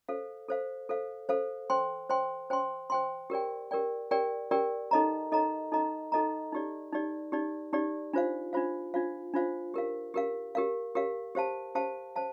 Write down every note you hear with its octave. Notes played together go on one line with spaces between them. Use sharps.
A4 C5 F5
A4 C5 F5
A4 C5 F5
A4 C5 F5
C5 G5 C6
C5 G5 C6
C5 G5 C6
C5 G5 C6
G4 A#4 D5 G5
G4 A#4 D5 G5
G4 A#4 D5 G5
G4 A#4 D5 G5
D#4 A4 D#5 A#5
D#4 A4 D#5 A#5
D#4 A4 D#5 A#5
D#4 A4 D#5 A#5
D#4 G4 D5
D#4 G4 D5
D#4 G4 D5
D#4 G4 D5
D4 F4 C5 F5
D4 F4 C5 F5
D4 F4 C5 F5
D4 F4 C5 F5
G4 A#4 F5
G4 A#4 F5
G4 A#4 F5
G4 A#4 F5
G4 C5 F5 A5
G4 C5 F5 A5
C5 F5 A5